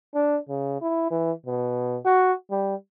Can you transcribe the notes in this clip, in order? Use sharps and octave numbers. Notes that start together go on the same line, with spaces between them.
D4
C#3
E4
E3
B2
F#4
G3